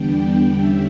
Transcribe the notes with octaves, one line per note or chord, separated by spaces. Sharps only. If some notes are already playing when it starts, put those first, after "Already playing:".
Already playing: E2 D3 G3 B3 D4 G5
E2 D3 G3 C#4 E5